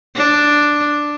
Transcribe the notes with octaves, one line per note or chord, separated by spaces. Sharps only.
D4